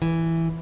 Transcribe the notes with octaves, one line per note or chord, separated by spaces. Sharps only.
E3